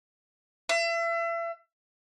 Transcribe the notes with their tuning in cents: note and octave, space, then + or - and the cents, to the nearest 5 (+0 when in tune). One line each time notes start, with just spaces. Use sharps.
E5 +35